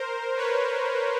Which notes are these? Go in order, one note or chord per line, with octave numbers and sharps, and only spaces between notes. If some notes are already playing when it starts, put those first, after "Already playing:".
Already playing: A#4 C5
B4 C#5